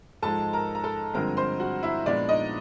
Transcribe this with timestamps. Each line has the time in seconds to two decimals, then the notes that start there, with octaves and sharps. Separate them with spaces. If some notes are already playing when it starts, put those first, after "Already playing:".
0.22 G#2 F3 G#3 A4 A5
0.53 A#4 A#5
0.75 A#5
0.84 A4 A5
1.14 G2 D3 F3 G#3 C4 A#4 A#5
1.37 C5 C6
1.60 F#4 F#5
1.83 E4 E5
2.06 A#2 F3 G#3 B3 D4 D5
2.29 D#4 D#5